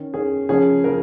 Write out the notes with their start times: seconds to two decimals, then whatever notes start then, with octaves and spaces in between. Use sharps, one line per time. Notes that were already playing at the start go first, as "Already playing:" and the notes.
Already playing: D#3 C#4
0.13 D#3 C#4 G#4
0.49 C#3 F3 A#3 C#4 G#4
0.84 C#3 F3 A#3 A#4